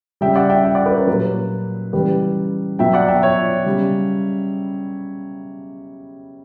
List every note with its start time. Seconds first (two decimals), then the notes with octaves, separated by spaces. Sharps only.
0.21 C#3 G3 E5 G5
0.36 D5 F#5
0.50 E5 G5
0.64 E5 G5
0.75 D5 F#5
0.86 B4 D5
0.96 A#4 C#5
1.07 A#2 F#3 G4 B4
1.93 C#3 E3 G3 G4 B4
2.79 B2 F#3 E5 G5
2.93 D5 F#5
3.08 E5 G5
3.22 C#5 E5
3.66 C#3 G3